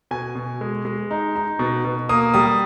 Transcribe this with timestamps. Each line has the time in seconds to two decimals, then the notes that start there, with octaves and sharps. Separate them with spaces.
0.11 B2 G#5
0.35 B2
0.61 G#3
0.85 G#3
1.11 D#4
1.36 D#4
1.59 B2
1.85 B2
2.09 A#3 D#6
2.34 G3 D#6